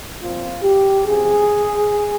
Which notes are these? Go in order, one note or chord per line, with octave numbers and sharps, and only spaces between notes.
A#2 F3 C4 F4
G4
C#3 F3 C4 G#4